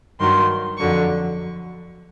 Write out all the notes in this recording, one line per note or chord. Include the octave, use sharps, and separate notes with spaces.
G2 D#3 F#3 C6
F2 D3 F#3 C#6